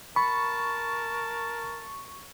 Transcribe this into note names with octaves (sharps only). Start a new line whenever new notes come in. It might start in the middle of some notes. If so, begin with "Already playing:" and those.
A#4 A5 B5 C#6